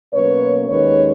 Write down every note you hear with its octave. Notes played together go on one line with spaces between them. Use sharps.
B2 F#3 A#3 C#4 B4 C#5
D#2 D#3 G#3 C#4 B4 C#5